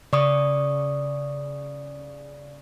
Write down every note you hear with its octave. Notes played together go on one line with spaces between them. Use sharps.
C#3 D5 C#6 D#6